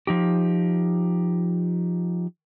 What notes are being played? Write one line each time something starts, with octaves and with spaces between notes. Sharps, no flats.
F3 D#4 G4